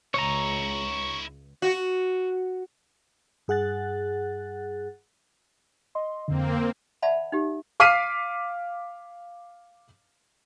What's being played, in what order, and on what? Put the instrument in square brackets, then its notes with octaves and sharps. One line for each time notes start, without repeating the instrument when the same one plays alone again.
[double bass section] C#2 [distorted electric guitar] D#4 E4 [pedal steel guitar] C#5 A#5
[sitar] F#4
[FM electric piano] G2 G#4 F#5 F#6 A6
[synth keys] D#5 C6
[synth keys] F2 D3 [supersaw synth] A#3 C4
[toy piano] D5 E5 F#5 A5 B5
D#4 G4
[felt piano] F5 D6 F6 B6 C7 D#7